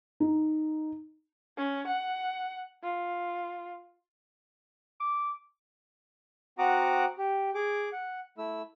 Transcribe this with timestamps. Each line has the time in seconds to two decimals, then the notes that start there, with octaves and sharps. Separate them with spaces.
0.20 D#4
1.58 C#4
1.88 F#5
2.83 F4
5.00 D6
6.59 C4 F#4 F#5 A#5 D6 D#6
7.18 G4
7.55 G#4 D6
7.93 F#5
8.38 A3 E4 E6